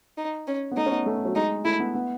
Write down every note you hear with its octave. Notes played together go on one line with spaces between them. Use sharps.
D#4
C#4
B3
A3 D#4
C#4
B3
A3
F#3
G#3 D#4
A3 E4
B3
B3